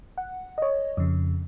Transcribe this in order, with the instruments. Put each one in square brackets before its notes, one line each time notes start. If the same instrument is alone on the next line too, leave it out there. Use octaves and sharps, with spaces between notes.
[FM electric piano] F#5
C#5 D#5
F2 C#3